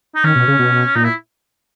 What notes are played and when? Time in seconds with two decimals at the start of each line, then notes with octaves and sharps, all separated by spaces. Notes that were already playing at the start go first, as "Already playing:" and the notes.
0.15 D#4
0.24 D#3 C#4
0.36 B2
0.48 C#3
0.59 B2
0.95 A#2 D#4
1.04 E4